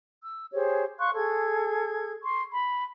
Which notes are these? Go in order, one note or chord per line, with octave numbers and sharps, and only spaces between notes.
E6
G4 G#4 C5 C#5
F5 C6 C#6 F#6
G#4 A4 G#6
C6 C#6
B5